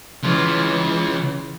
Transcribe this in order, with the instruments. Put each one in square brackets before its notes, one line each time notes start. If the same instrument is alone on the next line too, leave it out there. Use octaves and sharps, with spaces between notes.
[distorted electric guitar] C#3 F4 [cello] E3